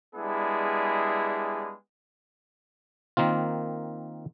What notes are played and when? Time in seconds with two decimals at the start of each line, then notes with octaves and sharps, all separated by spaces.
0.15 G3 G#3 B3 D4 E4 G#4
3.17 D#3 A#3 C4 F4